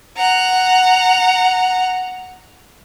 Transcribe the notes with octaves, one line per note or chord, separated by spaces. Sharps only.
F#5 A#5